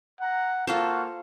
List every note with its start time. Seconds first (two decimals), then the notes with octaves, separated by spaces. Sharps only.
0.20 F#5 A#5
0.67 A#3 F4 F#4 A4 C5 F5